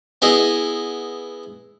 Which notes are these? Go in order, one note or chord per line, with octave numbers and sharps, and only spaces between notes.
B3 E4 G#4 D#5